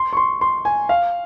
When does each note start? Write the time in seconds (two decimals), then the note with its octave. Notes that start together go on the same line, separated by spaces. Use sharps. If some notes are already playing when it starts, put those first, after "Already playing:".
Already playing: C6
0.13 C#6
0.17 C6
0.41 C6
0.65 G#5
0.89 F5